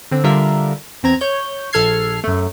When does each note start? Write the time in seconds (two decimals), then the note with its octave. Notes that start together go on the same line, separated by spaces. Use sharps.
0.11 D3 C4
0.24 D3 G3 D4 F4 A#4 E5
1.03 E2 C4 A#5 G#6
1.21 C#5 G6
1.73 A#1 A4 F6 G#6 C7
2.24 F#2 A3